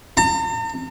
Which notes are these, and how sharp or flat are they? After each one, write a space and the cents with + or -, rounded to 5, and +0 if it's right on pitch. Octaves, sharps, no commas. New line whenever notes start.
A#5 -45